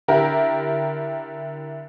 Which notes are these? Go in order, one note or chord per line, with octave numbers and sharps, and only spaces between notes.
D3 E4 G4 A#4